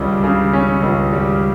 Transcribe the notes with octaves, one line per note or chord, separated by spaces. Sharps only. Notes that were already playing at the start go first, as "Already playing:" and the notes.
Already playing: C#2 C#3 G3 C#4
C#3
C#4
C#2
G3